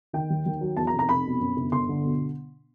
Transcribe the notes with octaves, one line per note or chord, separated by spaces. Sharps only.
D#3 G5
D#2
D#2
F#3
E2 A5
A#5
F1
A#5
F1 B5
B2
F#2
G1
G1 C6
D3
B2